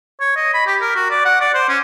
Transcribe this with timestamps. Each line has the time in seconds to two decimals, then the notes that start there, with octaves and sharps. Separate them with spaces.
0.20 C#5
0.36 D#5
0.54 B5
0.67 G4
0.81 A#4
0.95 F#4
1.10 D5
1.25 F#5
1.41 D5
1.54 C5
1.69 C#4